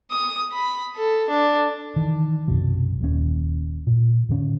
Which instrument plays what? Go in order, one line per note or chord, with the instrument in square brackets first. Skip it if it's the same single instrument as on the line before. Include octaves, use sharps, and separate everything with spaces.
[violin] D#6
B5
A4
D4
[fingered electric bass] D#3 E3
B1 F#2 C3 F#3
D#1 D#2 C#3 C#4
A#2
A2 D3 C#4